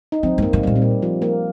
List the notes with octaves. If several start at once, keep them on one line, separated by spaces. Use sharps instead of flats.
D#4
F3 C4
G2
A#3
C3
A#2 G3
C4
A#3
F3
A#3